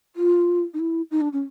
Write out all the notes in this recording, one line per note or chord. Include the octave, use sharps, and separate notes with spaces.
F4
D#4
E4
D#4
D4
C#4